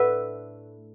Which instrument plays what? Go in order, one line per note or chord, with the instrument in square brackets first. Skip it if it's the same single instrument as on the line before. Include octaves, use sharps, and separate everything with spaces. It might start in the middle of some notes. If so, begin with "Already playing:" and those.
Already playing: [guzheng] A2 A3 D4 B4 D5 E5 F#5